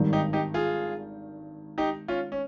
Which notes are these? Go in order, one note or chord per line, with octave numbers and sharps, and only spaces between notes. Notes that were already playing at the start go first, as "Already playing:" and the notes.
Already playing: G#1 G2 D#3
D#4 G4
D#4 G4
F4 G#4
D#4 G4
C#4 F4
C#4